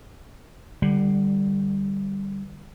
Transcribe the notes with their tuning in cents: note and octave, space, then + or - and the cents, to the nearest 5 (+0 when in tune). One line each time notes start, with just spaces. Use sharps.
D3 +25 G3 +0